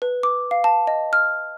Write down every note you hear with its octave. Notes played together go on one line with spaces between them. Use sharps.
B4
D6
F5
A5
D#5
F6